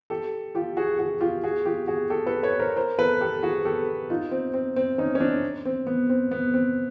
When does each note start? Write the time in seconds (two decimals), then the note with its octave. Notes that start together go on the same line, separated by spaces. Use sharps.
0.10 G4 A4
0.55 F4 G4
0.77 F#4 G#4
0.99 F#4 G#4
1.21 F4 G4
1.43 F#4 G#4
1.66 F4 G4
1.88 F#4 G#4
2.10 G4 A4
2.26 A4 B4
2.43 B4 C#5
2.60 A#4 C5
2.76 A#4 C5
2.99 A4 B4
3.21 G4 A4
3.43 F#4 G#4
3.65 G4 A4
4.10 D#4 F4
4.31 C4
4.54 C4
4.76 C4
4.98 C#4 D#4
5.15 C#4
5.20 C4 D4
5.65 C4
5.87 B3
6.09 C4
6.31 B3
6.54 C4